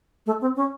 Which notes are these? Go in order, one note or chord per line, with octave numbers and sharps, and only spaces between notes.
A3
C4
C#4